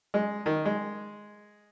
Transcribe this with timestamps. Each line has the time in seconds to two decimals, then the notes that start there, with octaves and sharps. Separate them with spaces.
0.14 G#3
0.46 D#3
0.65 G#3